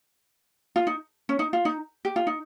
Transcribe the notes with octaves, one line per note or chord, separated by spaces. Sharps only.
F4
D#4
C#4
D#4
F4
D#4
G4
F4
D#4